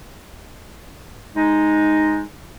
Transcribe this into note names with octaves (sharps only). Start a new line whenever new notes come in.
G#3 D#4